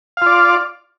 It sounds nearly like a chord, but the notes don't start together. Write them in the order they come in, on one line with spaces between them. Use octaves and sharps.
F5 F4 D5